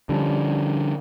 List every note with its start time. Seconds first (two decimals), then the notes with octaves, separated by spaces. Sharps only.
0.09 D3 F3 G3 C#4 D4